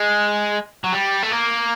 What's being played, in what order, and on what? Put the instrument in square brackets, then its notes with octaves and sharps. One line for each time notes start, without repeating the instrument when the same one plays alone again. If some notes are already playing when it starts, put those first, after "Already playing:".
Already playing: [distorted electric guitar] G#3
F#3
G3
A3
A#3